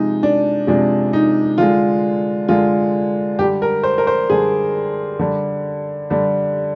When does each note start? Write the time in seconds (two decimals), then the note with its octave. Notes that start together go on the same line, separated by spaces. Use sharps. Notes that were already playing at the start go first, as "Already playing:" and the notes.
Already playing: C3 F3 G#3 D#4
0.23 D4
0.67 C3 F3 G#3 D4
1.13 D#4
1.58 D3 G#3 F4
2.49 D3 G#3 F4
3.39 D3 G3 G4
3.62 A#4
3.83 C5
3.98 A#4
4.07 C5
4.30 D3 G3 G#4
5.19 D3 G3
6.10 D3 G3